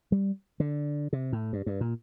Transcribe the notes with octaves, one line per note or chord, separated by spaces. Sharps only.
G3
D3
C3
A2
G2
G2
A#2